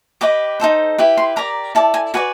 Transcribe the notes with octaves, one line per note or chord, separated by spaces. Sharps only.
G4 B4 D#5 D6
D#4 F#4 A4 C5
E4 G4 B4
C6
G4 A#4 D5 A#5
E4 A4 D5 A5
G#5
F#4 B4 D5 G#5